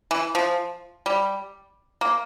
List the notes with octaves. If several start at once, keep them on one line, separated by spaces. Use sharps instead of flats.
E3
F3
G3
A#3